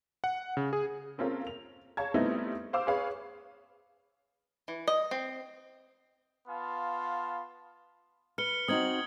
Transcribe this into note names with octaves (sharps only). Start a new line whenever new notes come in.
F#5
C#3
G#4
A#3 C4 C#4 F4 A4 A#4
F7
C#5 F5 A5 G#6
G3 A3 B3 C4 D#4 E4
C5 F5 D6 E6
G#4 B4 C#5 F5
E3
D#5
C4
B3 F4 F5 A5
B4 F6 C#7 G7
C4 D#4 F#4 D#6 G#6 F#7